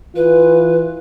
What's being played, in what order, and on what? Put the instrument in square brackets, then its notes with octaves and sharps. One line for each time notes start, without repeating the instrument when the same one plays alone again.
[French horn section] E3 F4 [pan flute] B4